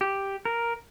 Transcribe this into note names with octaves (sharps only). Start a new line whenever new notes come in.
G4
A#4